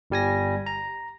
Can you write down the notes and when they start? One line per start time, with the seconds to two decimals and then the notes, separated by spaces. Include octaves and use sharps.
0.10 G1 G3 G#5 A#6
0.66 A#5